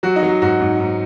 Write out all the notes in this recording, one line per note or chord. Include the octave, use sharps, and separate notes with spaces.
F#3 F#4
D#4
F#3
F#4
G#2 F#4
G#2
G#2